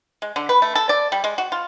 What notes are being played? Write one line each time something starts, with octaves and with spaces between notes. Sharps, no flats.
G#3
D3
B4
A3
A4
D5
G3
G#3
F#4
F4